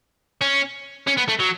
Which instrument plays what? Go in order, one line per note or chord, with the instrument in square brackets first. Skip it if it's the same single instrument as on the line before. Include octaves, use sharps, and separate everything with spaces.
[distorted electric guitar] C#4
C#4
B3
A3
F#3